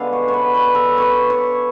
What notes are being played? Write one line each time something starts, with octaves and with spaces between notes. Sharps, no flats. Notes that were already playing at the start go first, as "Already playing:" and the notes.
Already playing: D3 G#3 B3 D4 F5
C#5
C#5
B4
B4
A4
B4 C#5
C#5